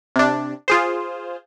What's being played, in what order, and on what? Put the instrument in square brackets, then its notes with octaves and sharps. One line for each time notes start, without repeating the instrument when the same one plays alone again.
[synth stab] C3 D4
F4 G#4 C5